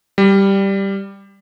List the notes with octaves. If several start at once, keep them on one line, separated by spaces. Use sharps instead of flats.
G3